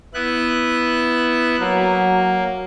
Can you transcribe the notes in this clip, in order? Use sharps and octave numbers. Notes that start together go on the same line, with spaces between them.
B3 E4 F#6
F#3 A#3